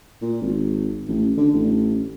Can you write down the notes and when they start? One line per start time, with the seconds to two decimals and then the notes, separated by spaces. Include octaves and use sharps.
0.21 A#2
0.41 G#1
1.08 A1
1.37 D3
1.53 A1